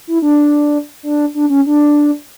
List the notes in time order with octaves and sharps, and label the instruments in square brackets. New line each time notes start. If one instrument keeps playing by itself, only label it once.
[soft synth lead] E4
D4
D4
D4
C#4
D4